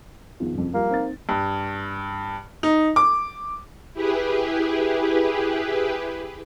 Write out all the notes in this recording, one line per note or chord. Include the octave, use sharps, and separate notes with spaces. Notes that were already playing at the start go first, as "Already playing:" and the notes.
E2 D#3 F3
F#1 F2
F3 G3 A#3
C4 D#4 A6
G2
D#4
D6
E4 G4 G#4 B4